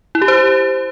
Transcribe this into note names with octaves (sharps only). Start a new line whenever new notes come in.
E4
G4
C5